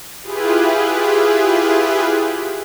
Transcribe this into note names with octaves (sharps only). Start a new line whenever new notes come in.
E4 F4 G4 G#4 B4